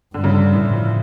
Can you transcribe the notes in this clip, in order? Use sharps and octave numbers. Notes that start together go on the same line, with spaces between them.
G2 D3
C#3
D3
A2 E3
F3